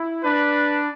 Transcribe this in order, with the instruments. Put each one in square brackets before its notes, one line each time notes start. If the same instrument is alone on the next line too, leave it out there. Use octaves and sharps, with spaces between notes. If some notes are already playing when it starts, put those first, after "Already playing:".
Already playing: [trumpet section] E4
[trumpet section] D4 [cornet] B4